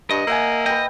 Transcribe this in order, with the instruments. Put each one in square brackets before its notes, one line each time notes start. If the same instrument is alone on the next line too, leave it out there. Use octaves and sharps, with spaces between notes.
[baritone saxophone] G2 [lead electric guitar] D#5
[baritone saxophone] A#3 [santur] E5 F#5 G#5
[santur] B4 G5 [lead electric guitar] D#5